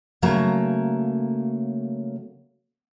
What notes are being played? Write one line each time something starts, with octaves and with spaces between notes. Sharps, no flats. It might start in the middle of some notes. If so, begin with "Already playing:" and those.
C#3 F#3 A3 A#3 A#5